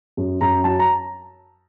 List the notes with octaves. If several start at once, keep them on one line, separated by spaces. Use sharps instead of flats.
F#2
F#2 A#5
F#3 A5
A#5